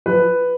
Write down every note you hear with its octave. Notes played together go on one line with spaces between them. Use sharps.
F3 B4